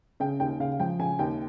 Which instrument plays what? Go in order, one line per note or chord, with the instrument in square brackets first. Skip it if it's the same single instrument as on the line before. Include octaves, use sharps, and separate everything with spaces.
[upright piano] C#3 G5
D#2 G5
C#3 F5
F3 G5
C#3 G#5
D#2 G5